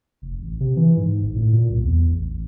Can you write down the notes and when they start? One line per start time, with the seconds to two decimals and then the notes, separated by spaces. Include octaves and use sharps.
0.22 F1
0.42 A1
0.60 C3
0.77 E3
0.97 G#2
1.23 G#1
1.35 A2
1.53 A#2
1.70 C2
1.83 E2
2.10 A1
2.30 A1